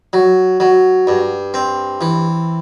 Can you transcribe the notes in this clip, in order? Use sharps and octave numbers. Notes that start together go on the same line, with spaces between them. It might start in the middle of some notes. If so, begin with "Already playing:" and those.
F#3
F#3
G2
C4
E3